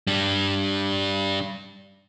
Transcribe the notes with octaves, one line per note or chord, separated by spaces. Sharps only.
G3 D4